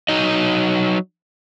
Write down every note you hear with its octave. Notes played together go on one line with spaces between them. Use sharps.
F#3 D#4 D#5